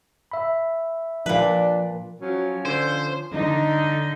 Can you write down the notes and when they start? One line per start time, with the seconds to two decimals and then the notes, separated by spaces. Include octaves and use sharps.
0.31 E5 B5
1.26 A#2 F3 D4 B4
2.21 F3 F#3 C#4
2.65 D3 C5
3.33 D3 D#4